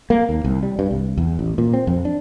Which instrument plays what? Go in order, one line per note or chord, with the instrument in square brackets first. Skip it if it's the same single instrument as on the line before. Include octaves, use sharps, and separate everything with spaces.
[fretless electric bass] A#3
D#2
C2
G3
G2
C2
E2
A1
A#2
C4
F2
D4